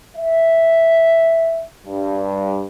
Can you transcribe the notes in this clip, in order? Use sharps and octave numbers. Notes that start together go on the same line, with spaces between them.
E5
G2